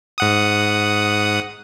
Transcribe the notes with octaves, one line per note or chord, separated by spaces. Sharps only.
G#2 F#5 D#6